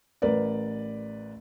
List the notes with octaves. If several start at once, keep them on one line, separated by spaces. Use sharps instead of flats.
A1 A#4 B4 D5